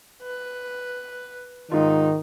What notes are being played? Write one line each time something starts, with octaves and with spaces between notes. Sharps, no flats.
B4
G#2 D#3 D#4 F4